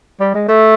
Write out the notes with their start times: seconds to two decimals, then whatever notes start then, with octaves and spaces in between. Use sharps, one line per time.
0.20 G3
0.34 G#3
0.49 A3